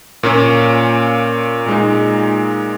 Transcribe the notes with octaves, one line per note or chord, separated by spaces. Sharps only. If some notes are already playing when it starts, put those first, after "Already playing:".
A#2 A#3 C#4
A#2 G#3 D#4